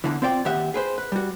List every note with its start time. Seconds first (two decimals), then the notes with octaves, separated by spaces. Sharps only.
0.04 E2 D3 E3
0.22 C4 F4 D5 E5 G5
0.45 D#2 D#3 G4 E5 F#5
0.74 G#4 B4 C5
0.98 B4
1.12 G3 F#4